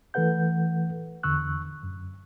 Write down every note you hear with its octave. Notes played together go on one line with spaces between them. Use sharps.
E3 A3 A4 B4 F#5 G6
E2 D3 C#6 E6 F#6
F#2